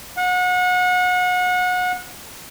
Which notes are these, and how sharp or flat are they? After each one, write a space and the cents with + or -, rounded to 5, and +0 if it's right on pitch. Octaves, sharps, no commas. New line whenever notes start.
F#5 -30